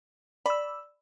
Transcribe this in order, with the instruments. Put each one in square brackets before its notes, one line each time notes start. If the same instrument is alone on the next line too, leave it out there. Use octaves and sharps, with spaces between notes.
[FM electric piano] D5 E6 [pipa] B5